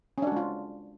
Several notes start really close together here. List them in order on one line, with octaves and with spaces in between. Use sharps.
C#4 D4 F#4 G#3 F4